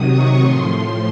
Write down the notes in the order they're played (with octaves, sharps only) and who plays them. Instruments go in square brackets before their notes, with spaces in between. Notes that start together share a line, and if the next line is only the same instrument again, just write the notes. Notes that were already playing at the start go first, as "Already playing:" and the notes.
Already playing: [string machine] C3 D#3 F#3 D#6
C#6
A2 F3 C6